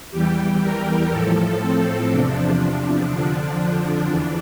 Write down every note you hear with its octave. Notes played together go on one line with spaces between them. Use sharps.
E2 E3 G3 G4
A#4
A2 F3 A4
C4
E2 C3 F3 D4
D4
F2 D3 F3 D4
D4
E2 E3